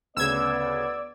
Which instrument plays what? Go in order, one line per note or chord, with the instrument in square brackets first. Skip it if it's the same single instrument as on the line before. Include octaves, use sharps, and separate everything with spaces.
[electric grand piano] D2 C#3 [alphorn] B3 [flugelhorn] D5 [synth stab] E6 G#6